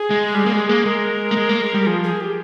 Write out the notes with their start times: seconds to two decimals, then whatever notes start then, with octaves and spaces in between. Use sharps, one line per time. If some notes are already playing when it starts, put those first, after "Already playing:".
Already playing: G#4
0.10 G#3
0.35 G3
0.46 A#3
0.53 G#3
0.69 A#3
0.85 G#3 A#4
1.31 A#3
1.37 G#3
1.49 A#3
1.61 G#3
1.74 G3
1.87 F3 G#4
2.03 G#4
2.21 G4